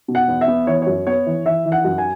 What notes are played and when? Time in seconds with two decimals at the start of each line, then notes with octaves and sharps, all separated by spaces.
0.08 B2
0.15 F#5
0.28 E2
0.41 E5
0.48 B3
0.67 E3 C#5
0.82 F#2 C#5
1.07 B3 C#5
1.26 E3
1.46 E3 E5
1.65 E3
1.72 F#5
1.85 F#2
1.98 G#5